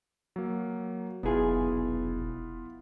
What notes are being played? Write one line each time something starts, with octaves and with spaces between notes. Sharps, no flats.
F#3 A#3
F1 B1 B3 E4 F4 G#4